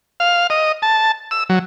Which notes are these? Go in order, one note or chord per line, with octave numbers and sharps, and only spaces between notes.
F5
D#5
A5
E6
F#3